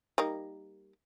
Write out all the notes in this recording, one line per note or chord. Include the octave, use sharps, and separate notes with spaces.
G3 A#3 D#4